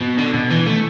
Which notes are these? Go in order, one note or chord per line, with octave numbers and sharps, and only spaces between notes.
B2
D3
B2
E3
A3